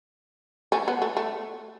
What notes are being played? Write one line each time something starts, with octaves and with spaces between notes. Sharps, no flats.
A3 C#4
B3
A3
A3